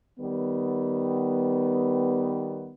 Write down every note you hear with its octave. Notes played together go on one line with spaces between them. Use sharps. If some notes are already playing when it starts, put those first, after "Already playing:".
D#3 G3 B3